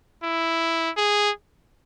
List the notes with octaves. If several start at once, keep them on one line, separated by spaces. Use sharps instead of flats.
E4
G#4